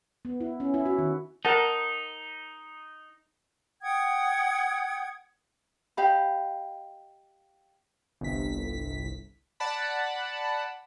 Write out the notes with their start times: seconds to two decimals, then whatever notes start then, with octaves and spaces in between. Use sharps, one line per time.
0.25 B3
0.40 E4
0.60 C#4
0.74 E4
0.85 F#4
0.98 D#3
1.45 D#4 A#4 F#5 A5
3.81 F#5 G5 D#6 G#6
5.97 G4 D#5 F5 B5
8.21 G1 C2 B6
9.60 D5 F#5 A5 B5